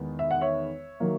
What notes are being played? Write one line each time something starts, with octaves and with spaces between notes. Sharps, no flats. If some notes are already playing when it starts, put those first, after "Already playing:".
Already playing: E2 D#3 G#3 B3
E5
F#5
C#5 E5
D#3 F#3 A#3